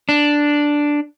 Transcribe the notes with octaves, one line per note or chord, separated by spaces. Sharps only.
D4